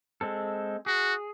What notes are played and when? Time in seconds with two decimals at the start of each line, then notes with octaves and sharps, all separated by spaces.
0.21 G#3 C4 A4
0.86 F#4 G#4